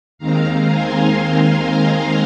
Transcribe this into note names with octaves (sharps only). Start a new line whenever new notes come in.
D#2 D#3 G#3 C4 F5 A#5
G#5 C6
F5 A#5